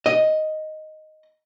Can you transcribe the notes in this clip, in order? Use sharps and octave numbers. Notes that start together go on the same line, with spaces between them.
D#5